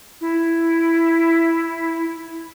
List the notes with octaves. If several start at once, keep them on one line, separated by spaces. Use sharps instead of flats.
E4